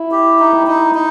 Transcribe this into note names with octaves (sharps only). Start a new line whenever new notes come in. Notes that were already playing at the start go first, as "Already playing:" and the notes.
Already playing: E4
G4
D#4
D#4
D#4